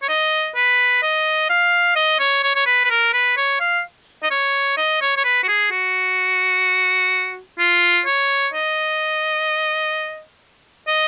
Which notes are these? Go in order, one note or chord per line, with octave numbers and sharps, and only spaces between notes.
C#5
D#5
B4
D#5
F5
D#5
C#5
C#5
C#5
B4
B4
A#4
B4
C#5
F5
D#5
C#5
D#5
C#5
C#5
B4
F#4
G#4
F#4
F4
C#5
D#5
D#5